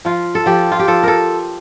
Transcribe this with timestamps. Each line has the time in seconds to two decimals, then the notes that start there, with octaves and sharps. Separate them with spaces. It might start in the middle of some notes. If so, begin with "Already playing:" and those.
0.05 F3 F4
0.35 A4
0.46 F3 G4
0.72 F4
0.79 G4
0.88 F3 A4
1.03 A4 A#4